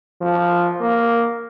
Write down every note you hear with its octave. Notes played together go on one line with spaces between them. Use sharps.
F3
A#3